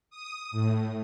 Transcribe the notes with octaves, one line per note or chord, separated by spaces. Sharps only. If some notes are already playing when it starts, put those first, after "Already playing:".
D#6
A2